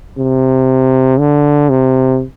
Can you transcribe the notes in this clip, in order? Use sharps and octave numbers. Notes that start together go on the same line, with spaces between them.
C3
D3
C3